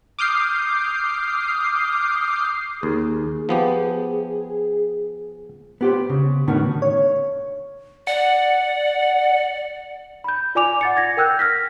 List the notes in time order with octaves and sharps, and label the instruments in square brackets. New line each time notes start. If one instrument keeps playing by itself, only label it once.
[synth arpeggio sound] D6 D#6 F6 G6 C7
[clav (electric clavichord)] D#2 [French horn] G#4
[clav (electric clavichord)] F3 B3 G4
[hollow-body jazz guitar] B3 G4 C5
C#3
A2 D3 D#3 B3 C#4 F#4
[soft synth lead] C#5
[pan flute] D5 [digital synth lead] F#5
[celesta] B5 G6
F4 D5 G#5 D6 F7
F#5 A6 C#7
G#6 A#6
A#4 G5 E6 F#6 G6
F6 A#6 B6